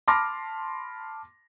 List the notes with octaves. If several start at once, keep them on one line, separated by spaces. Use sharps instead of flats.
A5 B5 C6 D6 F6 A#6